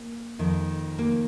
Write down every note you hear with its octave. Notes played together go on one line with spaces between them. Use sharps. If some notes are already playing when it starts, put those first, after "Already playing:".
Already playing: A#3
F2 D#3
A#3